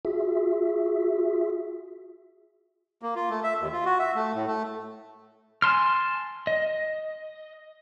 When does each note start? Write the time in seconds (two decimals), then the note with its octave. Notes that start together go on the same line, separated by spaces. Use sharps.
0.05 F4 F#4 G#4 E5
3.02 A#3
3.16 F4
3.30 A3
3.44 E5
3.60 D#2
3.73 F4
3.86 F#4
3.99 E5
4.15 A3
4.34 A2
4.47 A3
5.62 G#5 A5 C6 F6
6.47 D#5